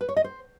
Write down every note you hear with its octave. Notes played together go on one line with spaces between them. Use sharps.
B4
C#5
D#5
C5